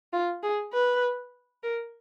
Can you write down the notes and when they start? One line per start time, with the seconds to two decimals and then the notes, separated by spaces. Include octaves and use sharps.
0.13 F4
0.43 G#4
0.73 B4
1.63 A#4